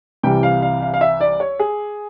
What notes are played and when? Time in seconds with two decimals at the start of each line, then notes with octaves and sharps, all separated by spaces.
0.23 C2 C3 E3 G3 G5
0.43 F5
0.62 F5
0.82 F5
0.94 F5
1.01 E5
1.21 D5
1.40 C#5
1.59 G#4